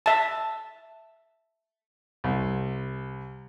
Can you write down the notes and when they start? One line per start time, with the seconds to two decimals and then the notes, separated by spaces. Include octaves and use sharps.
0.06 E5 A5
2.24 C2